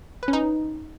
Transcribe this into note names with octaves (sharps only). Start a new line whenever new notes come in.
B4
C#4
D#4